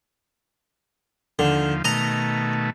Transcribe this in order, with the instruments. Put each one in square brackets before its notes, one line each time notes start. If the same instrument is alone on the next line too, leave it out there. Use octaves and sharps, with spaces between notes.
[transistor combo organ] D#2 F3 [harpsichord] D3
[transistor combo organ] B2 D#3 A3 [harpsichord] D#5 A#5